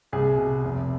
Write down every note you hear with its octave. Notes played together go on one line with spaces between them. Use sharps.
C2 G#4
B2
F1